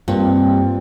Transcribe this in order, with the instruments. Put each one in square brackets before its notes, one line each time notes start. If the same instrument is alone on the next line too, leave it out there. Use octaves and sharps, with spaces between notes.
[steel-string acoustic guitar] G2 [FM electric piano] A#3 C4 F4